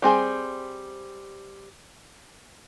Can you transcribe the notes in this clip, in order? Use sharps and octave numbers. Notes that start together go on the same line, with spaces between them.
G3 C4 G#4 C5